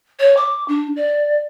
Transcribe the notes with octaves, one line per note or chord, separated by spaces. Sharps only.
C#5
D6
D4
D5